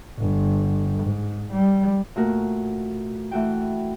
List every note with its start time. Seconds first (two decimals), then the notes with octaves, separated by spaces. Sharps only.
0.18 G1
1.03 G#2
1.51 G3
2.16 A#2 A3 F#4 A#4
3.31 E3 A3 F#4 G5